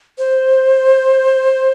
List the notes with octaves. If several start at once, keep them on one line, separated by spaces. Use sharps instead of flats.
C5